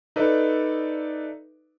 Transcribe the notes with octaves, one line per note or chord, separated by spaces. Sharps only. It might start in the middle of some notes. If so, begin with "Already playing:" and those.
D#4 A4 B4 D5 E5